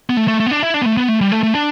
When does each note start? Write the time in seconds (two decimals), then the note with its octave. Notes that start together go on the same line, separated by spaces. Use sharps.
0.10 B3
0.17 A3
0.28 A3
0.40 A3
0.46 B3
0.51 D4
0.63 E4
0.74 D4
0.82 B3
0.86 A3
0.97 B3
1.09 A3
1.21 G3
1.32 A3
1.43 A3
1.55 D4